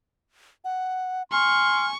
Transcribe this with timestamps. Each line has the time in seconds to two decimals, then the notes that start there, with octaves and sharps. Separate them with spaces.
0.64 F#5
1.32 G#5 C6 C#6 F6